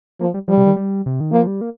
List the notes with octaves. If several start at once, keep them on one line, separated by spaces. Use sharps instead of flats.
F3 A#3
G3
F3 G3
C3
D#3
G3
C3
D#3
F3 A#3
G3
A#3